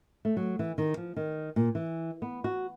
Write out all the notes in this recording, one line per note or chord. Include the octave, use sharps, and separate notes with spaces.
A3
F#3
E3
D#3
F3
D#3
A#2
E3
B3
F#4